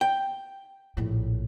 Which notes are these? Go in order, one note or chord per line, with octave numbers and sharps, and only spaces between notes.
G5
A#1 A2